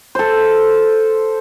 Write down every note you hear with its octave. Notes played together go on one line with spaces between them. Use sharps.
A4 C5